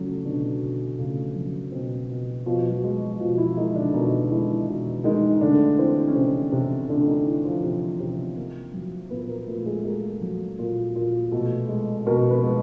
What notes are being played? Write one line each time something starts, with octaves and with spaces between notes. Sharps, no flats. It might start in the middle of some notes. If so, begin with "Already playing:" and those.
Already playing: C#3 F#3 A3 C#4
B2 D3 D4
B2
C#3 A3 C#4
F#3
B2 C4
B2
B2 F3 F4
F#3 F#4
G#3
B2 F3 F4
E3 E4
D#3 G#3 D#4
D3 D4
B2 D#3 D#4
E3 G#3 E4
B2
D#3 G#3 D#4
D#4
D3 A3 D4
E3 C4
C#4
C3 C4
C3
D3 A3 D4
D#3 D#4
E3
F3 F4
C3
C3
A#3
F#3
A#2 B3 B4
A#3 A#4
A#2 A3 A4
G#3 G#4
G#3 A#3 G#4
F#3
A#2
A#2
B2 A3 A4
G#3
B2 A#3 A#4
B3 B4
G#3